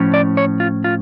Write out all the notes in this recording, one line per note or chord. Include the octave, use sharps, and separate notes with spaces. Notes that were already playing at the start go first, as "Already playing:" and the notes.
Already playing: A2 F3 C#4
D5
C#5
F4
F4